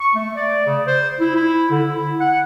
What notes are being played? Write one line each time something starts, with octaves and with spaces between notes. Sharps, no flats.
C#6
A3
D5
C#3
C5
E4
E4
D3
E4
F#5